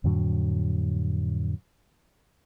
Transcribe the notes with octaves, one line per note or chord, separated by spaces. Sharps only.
F2 A2 D3 F#3